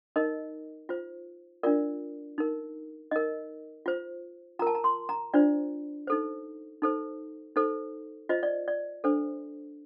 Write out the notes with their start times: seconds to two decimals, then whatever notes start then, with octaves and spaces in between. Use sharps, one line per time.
0.16 D#4 A#4 D#5
0.89 F4 C5
1.63 D4 F4 A#4 D5
2.38 D#4 A#4
3.11 D#4 A#4 D#5
3.86 F4 C5
4.59 F4 A#5
4.62 A#4 A5
4.75 A#5
4.84 C6
5.09 A#5
5.34 D4 F4 C5 D5
6.07 D#4 A4 C5
6.82 D#4 A4 C5
7.56 D#4 A4 C5
8.29 F4 C5 D#5
8.43 D5
8.68 D5
9.04 D4 A4 C5